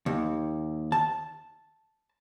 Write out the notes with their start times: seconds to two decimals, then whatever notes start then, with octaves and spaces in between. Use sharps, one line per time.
0.06 D#2
0.92 A5